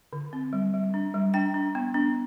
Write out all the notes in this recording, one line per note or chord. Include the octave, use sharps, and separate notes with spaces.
D3
C4
G3
G3
D4
G3
D4 G5
D4
B3
D4